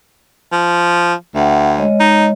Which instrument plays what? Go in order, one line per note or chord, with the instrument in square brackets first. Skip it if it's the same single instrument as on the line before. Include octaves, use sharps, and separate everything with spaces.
[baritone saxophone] F3
[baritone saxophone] D2 [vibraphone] E5 F#5 G5
[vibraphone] G#3 C#5 D#5
[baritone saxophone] D#4